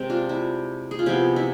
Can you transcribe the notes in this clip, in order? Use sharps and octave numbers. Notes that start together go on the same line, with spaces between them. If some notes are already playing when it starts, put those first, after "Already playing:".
Already playing: C3 G#3 C4
D4 F4
E4
G#4
F4
C3 F3 B3 E4
E4